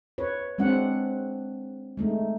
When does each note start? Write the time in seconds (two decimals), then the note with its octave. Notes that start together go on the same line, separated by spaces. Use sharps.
0.18 B4 C#5
0.58 G#3 C4 D4 F#5
1.97 G#3 A3 D#4